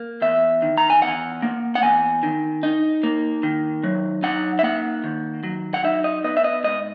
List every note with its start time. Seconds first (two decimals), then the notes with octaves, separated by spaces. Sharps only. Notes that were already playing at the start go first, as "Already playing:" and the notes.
Already playing: A#3
0.22 E2 E5
0.62 D#3
0.78 A#5
0.90 G#5
1.02 E2 F#5
1.42 A#3
1.75 F#5
1.83 E2 G#5
2.23 D#3
2.63 D#4
3.03 A#3
3.43 D#3
3.84 F#3
4.23 D#4 F#5
4.59 E5
4.63 A#3 F#5
5.04 D#3
5.44 F#3
5.74 F#5
5.84 D#4 E5
6.04 D#5
6.24 B3 D#5
6.37 E5
6.44 D#5
6.64 G#2 D#5